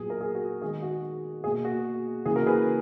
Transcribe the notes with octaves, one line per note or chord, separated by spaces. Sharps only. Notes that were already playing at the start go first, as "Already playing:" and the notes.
Already playing: A#2 F#3 B3 G#4
A#4
G#4
F#4
D#3 G#3 B3 G#4
F#4
B2 A#3 G#4
F#4
C#3 E3 A#3 G#4
F#4 A#4
G#4 B4